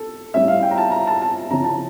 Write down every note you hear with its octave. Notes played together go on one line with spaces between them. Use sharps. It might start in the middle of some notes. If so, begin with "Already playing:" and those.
Already playing: A4
A2 G3 C#4 E4 E5
F5
G5
A#5
A5
A#5
A5
A5
C#3 F3 C#4 E4 A#5
A5